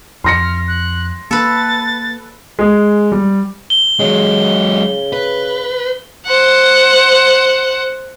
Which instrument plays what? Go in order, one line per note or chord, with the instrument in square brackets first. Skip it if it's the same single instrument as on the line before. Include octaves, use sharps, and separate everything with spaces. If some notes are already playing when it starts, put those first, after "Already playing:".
[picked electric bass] F2 [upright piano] C6 A#6 C#7 [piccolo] F6
[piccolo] F#6
[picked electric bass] A#3 [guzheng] A4 B4 [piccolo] A6
[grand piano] G#3 G#4
G3
[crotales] G7
[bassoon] C#3 [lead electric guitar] F#3 G#3
[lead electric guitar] B4
[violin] C5 F#5